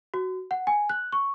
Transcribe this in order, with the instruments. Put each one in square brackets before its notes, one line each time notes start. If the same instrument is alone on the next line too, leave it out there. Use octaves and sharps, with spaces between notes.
[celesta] F#4
F#5
G#5
F#6
C#6